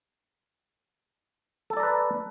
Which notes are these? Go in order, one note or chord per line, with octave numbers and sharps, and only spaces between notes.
A4 B4 D5 A5 A#5